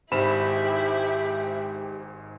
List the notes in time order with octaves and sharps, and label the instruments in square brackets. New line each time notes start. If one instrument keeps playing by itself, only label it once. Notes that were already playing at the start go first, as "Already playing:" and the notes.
[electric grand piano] G#1 G#2 [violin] E4 [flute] G4 [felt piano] C5 B5 E7